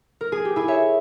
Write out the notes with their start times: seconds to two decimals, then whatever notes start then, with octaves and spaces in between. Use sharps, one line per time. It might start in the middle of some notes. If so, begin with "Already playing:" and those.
0.21 A#4
0.32 G#4
0.45 G4
0.56 E4 G#4
0.68 C#5 E5